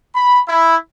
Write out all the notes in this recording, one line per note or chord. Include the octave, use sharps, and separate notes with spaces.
B5
E4